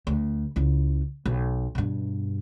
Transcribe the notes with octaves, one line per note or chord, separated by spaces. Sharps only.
D2
C#2 E4
B1
G2 B2